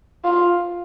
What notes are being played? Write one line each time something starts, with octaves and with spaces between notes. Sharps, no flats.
F4